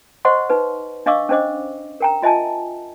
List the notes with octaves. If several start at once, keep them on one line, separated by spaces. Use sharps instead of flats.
C5 D#5 F#5 C6 C#6
D#4 B4
D4 D#5 F5 C#6 D6 E6
C#4 D4 C5 D#5 D6
A#4 G5 A#5
F4 D#5 E5 G#5 A5